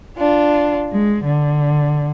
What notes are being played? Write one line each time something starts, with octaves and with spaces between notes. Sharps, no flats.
D4 F4
G#3
D3